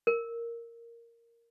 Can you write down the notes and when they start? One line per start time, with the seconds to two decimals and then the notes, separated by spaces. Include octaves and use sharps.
0.07 A#4